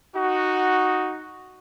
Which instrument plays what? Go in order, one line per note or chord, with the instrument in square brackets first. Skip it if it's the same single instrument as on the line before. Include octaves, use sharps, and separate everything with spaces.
[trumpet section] D#4 F#4